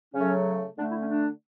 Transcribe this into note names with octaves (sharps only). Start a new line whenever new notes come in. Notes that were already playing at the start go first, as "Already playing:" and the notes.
C#3 F#3 A3 C#4
D3 A3 D4
E4
C#4
D4